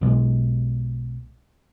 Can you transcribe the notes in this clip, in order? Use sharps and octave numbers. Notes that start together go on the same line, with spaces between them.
B1 B2 E3 G#3